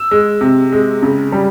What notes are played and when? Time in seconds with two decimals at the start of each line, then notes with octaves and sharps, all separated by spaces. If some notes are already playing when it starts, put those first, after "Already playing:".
Already playing: E6
0.11 G#3
0.41 C3
0.72 G#3
1.03 C#3
1.32 G3